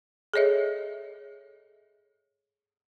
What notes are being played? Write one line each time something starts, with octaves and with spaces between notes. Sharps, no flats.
G#4 A4 C#5 D#5 E5